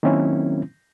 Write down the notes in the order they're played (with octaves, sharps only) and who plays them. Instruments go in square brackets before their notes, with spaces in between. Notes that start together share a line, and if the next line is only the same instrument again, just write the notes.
[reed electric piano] D#3 F#3 A#3 C4 C#4 E4